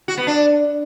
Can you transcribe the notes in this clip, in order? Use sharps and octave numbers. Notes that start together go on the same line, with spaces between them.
F#4
B3
D4